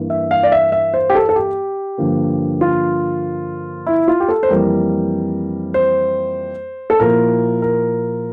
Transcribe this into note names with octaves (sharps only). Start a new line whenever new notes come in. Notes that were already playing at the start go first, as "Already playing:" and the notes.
Already playing: G2 E3 A#3
E5
F5
D5
E5
E5
C5
G4
A4
A4
G4
G2 D3 F3 A#3
F4
E4
F4
G4
A4
C5
F2 E3 G3 A#3 A#4
C5
A4
A#2 F3 A#3 E4 A#4
A#4